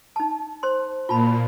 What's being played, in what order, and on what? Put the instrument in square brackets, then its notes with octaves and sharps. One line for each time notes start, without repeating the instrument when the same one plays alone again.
[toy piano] D#4 A5
C5 C6
[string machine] A#2 [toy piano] F4 A5 B5